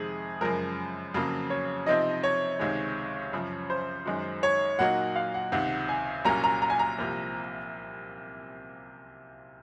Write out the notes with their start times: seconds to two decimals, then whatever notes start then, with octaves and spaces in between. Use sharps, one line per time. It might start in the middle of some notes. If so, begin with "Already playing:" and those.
Already playing: F2 C3 D#3 G#3 G#4
0.41 F#2 C#3 F3 G#3 A#4
1.14 F2 C#3 F#3 A#3
1.50 C#5
1.86 C3 F3 C4 D#4 D#5
2.24 C#5
2.59 C#2 C3 D#3 G#3
3.33 F#2 C#3 F3
3.70 C5
4.06 F#2 D#3 G#3 D#4 F#4
4.43 C#5
4.79 A#2 F#3 A#3 D#4 F#4 F#5
5.16 F5
5.34 F#5
5.52 C#2 C3 D#3 F#5
5.89 G#5
6.25 C2 A#2 F#3 A#3 C#4 A#5
6.44 A#5
6.62 A#5
6.70 G#5
6.79 A#5
6.99 C2 C3 F3 A#3